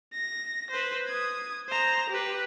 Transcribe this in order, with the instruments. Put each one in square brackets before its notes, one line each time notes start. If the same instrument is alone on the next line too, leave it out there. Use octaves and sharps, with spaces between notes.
[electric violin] A#6
B4 C5
D#6 G#6
C5 A#5
G4 B4